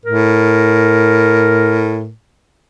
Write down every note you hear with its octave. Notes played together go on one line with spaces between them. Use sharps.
A2 A#4